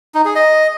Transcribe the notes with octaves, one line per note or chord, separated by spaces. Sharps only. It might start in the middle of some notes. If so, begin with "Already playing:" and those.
D#4
G#4
D#5